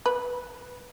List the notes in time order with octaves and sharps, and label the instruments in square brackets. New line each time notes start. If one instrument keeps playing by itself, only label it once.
[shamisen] B4